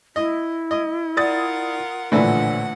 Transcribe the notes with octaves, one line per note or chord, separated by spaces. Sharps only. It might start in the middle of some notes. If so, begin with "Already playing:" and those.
E4 D#5
D#5
F4 A#4 D5 F#5 D#6 A6
A#1 A2 D3 E3 F4 F#5